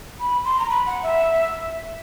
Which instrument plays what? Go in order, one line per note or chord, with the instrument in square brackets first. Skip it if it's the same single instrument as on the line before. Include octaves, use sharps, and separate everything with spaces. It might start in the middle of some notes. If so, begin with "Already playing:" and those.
[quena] B5
C6
A#5
B5
F#5
E5